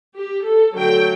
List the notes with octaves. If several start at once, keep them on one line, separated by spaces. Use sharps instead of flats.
G4
A4
D3 F#3 A3 G5